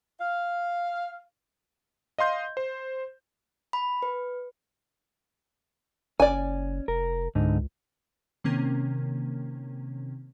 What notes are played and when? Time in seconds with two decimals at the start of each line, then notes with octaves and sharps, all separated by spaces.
0.20 F5
2.18 D#5 F5 C6 G6
2.57 C5
3.73 B5
4.02 B4
6.20 F#1 C#4 D5 G#5
6.88 F1 A#4
7.35 C#2 G#2 D3 D#4
8.44 C3 D#3 A#3 C4 C#4 A#4